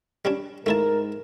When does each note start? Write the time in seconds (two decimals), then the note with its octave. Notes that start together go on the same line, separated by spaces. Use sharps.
0.25 G3 C#4 D4
0.66 G#2 A3 E4 A#4 A5